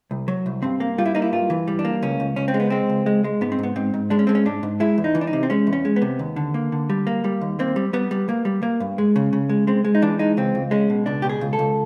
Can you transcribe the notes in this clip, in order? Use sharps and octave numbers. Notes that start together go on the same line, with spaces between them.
C2
F#3
C2
G2 C4
A#3
G3 F4
E4
A#3 D#4
E4
G2 F4
E3
G3
D4
A#3
C#2 C#4
C#2
C#2 C#4
C4
G#3
B3
G#3 C4
C#2
G#3
G#3
G#2 B3
C4
G#2 B3
G#2 C4
G#2
G#3 D4
C#4
G#3 C4
C#4
G#2 D4
G#2
G#3 E4
E2
D#4
E3
D4
D#4
C3
C4
G#3 C#4
E2
C#4
G#3
B3
C3
D#2
D3
A#3
D3
G3
A#3
G3
D#2
A#3 C4
G3
G3 B3
G3
A#3
G3
A#3
G2
G#3
C#3
C#3
G#3
G#3 C4
G#3
D#4
E3 D4
G#3 D#4
C#2 C4
C#2
G#3 C#4
B2
C#2 D4
B2 G4
G#4
C#2
A4
C#2